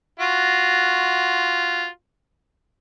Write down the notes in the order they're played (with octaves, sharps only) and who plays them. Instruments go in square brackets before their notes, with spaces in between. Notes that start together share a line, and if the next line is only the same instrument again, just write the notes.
[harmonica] F4 F#4